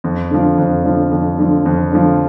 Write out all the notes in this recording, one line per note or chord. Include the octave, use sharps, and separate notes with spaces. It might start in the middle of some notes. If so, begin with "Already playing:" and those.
F2
D3 F3
F2
D3 F3
F2
D3 F3
F2
D3 F3